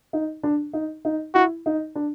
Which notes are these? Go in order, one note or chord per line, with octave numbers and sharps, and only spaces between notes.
D#4
D4
D#4
D#4
E4 F#4
D#4
D4